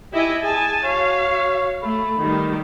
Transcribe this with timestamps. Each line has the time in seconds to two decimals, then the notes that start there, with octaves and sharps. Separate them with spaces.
0.13 E4 G4 D#5 G#5
0.43 G#4 G#5 A5
0.84 F#4 C#5 F5
1.83 A3 B5
2.19 D#3 G3